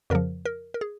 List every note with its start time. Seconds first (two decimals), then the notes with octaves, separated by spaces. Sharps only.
0.10 F2 C#3 F3 A#4
0.45 A#4
0.74 A#4
0.81 G#4